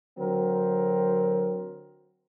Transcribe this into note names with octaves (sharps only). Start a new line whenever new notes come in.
D3 F#3 C4 A#4